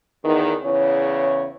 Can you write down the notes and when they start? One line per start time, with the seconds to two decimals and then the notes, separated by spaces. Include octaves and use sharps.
0.23 E2 D#3
0.64 E2 C#3 E4 C#5